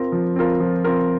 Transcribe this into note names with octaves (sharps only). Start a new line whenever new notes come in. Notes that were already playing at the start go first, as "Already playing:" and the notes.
Already playing: C4 F4 A#4
F3
C4 F4 A#4
F3
C4 F4 A#4